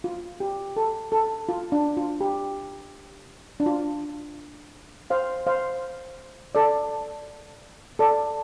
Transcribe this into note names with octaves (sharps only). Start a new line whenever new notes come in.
F4
G4
A4
A4
F4
D4
F4
G4
D4
F4
C5 F5
C5 F5
A4 D5
A4 D5